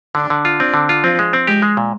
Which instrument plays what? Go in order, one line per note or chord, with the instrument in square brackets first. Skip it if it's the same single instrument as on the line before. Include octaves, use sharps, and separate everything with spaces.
[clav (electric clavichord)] D3 [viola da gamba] D4
[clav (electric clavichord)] D3
F4
[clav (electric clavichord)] C4 [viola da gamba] D4
[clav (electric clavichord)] D3
F4
[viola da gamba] F3 [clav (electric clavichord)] C4
[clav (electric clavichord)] G#3
C4
[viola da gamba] G#3 [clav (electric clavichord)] G4
[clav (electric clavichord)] G#3
A#2